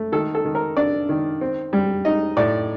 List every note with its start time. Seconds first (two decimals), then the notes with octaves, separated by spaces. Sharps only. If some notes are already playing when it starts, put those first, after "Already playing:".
Already playing: A3
0.12 D#3 A4
0.35 A4
0.45 D#3
0.55 A#4
0.77 D4 D5
1.09 D#3
1.41 C4
1.73 G3
2.05 D#4 D#5
2.37 A2 D5